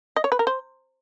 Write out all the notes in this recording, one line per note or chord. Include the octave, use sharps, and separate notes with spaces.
D#5
C#5
B4
A#4
C5